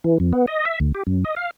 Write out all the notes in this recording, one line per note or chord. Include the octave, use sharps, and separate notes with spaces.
E3
F2
B3
D#5
E5
D2
G4
F#2
D#5
F5